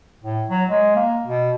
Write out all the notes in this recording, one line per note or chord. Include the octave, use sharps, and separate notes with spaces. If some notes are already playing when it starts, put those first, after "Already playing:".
A2
F#3
G#3
A#3
B2